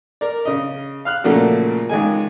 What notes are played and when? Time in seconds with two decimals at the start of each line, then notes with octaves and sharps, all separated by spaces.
0.21 A#4 D5
0.45 C#3 D#5
1.05 F5 F6 F#6
1.24 A#2 C#3 F3 A3 A#3 F#4
1.89 C#2 D#3 G#3 G#5